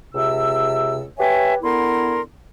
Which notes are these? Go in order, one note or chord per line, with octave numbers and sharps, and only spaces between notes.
C#2 C3 E6
G4 B4 C#5 E5 G#5
D3 B3 E4 A#4 C6